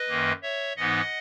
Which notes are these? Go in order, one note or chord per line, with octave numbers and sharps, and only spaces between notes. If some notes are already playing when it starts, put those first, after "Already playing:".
Already playing: B4 D#5
F#2 D#3 A#3
C#5 E5
G#2 E3 B3 D#4 D#5 F#5